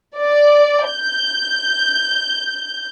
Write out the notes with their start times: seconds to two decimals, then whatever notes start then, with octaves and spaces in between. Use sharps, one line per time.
0.17 D5
0.90 G6